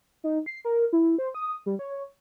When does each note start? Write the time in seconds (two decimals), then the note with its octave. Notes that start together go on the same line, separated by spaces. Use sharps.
0.24 D#4
0.46 C7
0.65 A#4
0.93 E4
1.18 C5
1.35 D#6
1.66 G3
1.79 C#5